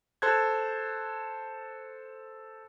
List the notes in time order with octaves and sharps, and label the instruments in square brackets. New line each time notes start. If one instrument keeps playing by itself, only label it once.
[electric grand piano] A4 C5 A5 F#6 G#6